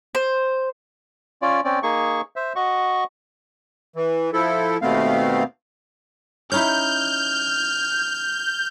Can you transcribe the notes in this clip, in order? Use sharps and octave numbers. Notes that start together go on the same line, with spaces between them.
C5
C#4 F4 D5
C4 C#4 D5
A#3 D#4 G#4 C#6
C5 E5
F#4 D#5 F#5 C#6
E3
F3 E4 A4
D#2 B2 A3 B3 C4 F5
C#4 D#4 E4 F6 G6